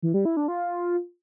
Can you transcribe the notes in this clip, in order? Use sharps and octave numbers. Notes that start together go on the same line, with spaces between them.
E3
G3
E4
D4
F4